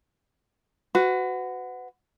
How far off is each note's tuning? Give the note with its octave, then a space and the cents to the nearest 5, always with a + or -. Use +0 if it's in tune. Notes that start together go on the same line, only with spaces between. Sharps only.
F#4 +0 B4 +35